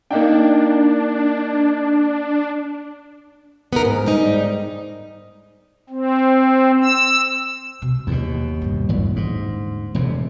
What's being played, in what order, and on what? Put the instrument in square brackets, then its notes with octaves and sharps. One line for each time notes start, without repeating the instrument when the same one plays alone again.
[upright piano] A#3 D#4 G5 [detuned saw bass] D4
[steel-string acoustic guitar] B3 D#4 F4 A#4
G#2
G#2 G3 D#4
[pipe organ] C4
E6
[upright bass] B2
[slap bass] D#2 B2 [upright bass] D#3
[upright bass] G2 A#2
[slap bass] G#1 E2 F#3
[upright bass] D#1 D3 [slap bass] G#2
[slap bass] E1 E2 C3